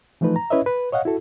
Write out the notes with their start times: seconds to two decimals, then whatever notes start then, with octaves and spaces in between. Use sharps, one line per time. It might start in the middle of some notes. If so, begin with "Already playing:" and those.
0.21 E3 F3 A3 D#4 B4
0.36 A#5
0.50 C#4 E4 B4 C#5 D#5 E5
0.66 B4
0.92 C#5 D#5 F5 F#5
1.05 E4 F#4 A4